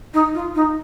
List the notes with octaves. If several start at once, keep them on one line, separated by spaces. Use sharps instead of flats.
D#4
F4
D#4